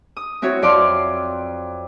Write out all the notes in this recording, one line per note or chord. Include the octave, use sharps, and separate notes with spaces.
D#6
C4 E4 F#4 C#5
F2 D5 F5 C6